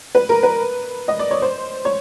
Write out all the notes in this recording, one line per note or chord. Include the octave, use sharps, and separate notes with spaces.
B4
A#4
B4
D#5
D5
C#5
C5
C#5